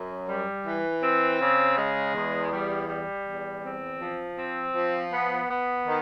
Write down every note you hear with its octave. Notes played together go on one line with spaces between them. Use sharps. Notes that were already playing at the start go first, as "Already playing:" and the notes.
Already playing: F#2
G3
E3
C4
C#3
G#3
E2
G3
G3
E2
C4
F3
C4
F3
B3
B3
D#3